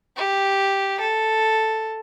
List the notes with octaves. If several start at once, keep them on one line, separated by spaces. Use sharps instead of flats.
G4
A4